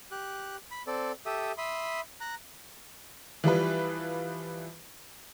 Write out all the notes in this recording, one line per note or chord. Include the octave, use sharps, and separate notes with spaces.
G4 F#6
B5
C4 A4 D5
G4 A4 E5 D#6
E5 B5 C6 D#6
A#5 F#6
E3 F3 G3 B4